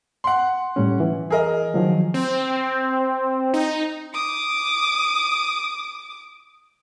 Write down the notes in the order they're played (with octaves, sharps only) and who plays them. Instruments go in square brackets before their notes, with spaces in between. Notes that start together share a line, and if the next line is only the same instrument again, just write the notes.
[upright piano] F#5 C6
[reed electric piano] A2 G3 C#4
E3
[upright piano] G#4 A#4 D#5
[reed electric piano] D#3 F3 F#3
[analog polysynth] C4
D#4
[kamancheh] D6 D#6